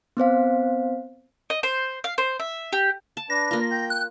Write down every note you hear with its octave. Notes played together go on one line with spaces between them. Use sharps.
B3 C4 C5 F5
D#5
C5
F5
C5
E5
G4
A5
D4 B4 A#6
A#3 F4
G5 G6
F#6